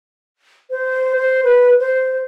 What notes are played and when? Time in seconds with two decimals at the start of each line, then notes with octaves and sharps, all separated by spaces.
0.70 C5
1.16 C5
1.43 B4
1.79 C5